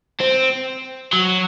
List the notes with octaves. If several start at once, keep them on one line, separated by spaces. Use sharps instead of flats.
C4
F#3